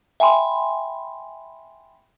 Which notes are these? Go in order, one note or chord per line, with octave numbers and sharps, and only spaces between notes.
E5 G5 G#5 B5 C6